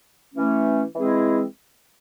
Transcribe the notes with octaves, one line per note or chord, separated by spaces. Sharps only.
E3 A3 C#4
E3 G#3 C4 E4 G#4